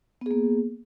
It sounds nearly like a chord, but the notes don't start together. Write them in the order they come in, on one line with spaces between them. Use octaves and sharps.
B3 G#4 A#3